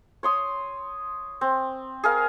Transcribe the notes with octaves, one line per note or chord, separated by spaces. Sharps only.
C#5 C6 D#6
C4
G#4 A#4 F5